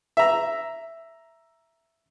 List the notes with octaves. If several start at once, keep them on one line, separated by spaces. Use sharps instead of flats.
E5 A#5